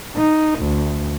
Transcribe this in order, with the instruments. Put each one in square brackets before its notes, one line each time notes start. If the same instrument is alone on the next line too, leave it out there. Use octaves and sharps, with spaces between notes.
[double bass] D#4
D2